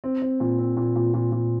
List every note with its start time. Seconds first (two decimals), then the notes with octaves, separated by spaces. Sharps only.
0.04 C4
0.22 C4
0.40 A#2
0.59 C4
0.77 A#2
0.96 A#2
1.14 A#2
1.32 A#2